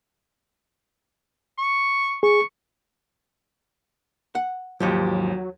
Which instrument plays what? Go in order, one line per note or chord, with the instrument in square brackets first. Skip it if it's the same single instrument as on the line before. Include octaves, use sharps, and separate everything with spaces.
[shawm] C#6
[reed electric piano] G#4 [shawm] C#6
[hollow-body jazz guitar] F#5
[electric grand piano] D#2 F3 [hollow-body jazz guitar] G#2 G4 C#5 [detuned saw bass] F#3